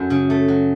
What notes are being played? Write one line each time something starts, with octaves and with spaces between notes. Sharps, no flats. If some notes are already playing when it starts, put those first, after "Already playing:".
Already playing: F#2 F#3 A3
C#3
A3
F#3